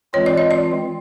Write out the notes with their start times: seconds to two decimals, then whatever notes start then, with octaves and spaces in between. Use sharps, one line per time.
0.14 E3 G#3 C4 F4 C#5
0.26 D5
0.38 D#5
0.51 D5